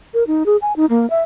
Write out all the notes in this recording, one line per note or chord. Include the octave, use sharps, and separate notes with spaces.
A#4
D#4
G#4
G#5
D#4
A#3
E5